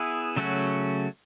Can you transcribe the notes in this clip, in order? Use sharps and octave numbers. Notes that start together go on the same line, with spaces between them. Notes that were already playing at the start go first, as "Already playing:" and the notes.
Already playing: B3 E4 G#4 B4
C#3 F#3 A3 C#4 F#4